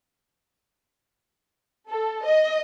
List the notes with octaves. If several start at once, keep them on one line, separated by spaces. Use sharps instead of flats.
A4
D#5